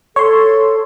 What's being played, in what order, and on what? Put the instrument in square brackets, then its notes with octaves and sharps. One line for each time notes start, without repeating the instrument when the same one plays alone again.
[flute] A4 [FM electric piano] C#5 C6